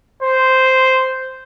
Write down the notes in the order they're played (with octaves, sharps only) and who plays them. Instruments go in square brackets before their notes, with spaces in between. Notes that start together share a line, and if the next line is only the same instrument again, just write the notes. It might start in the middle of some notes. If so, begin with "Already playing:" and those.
[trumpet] C5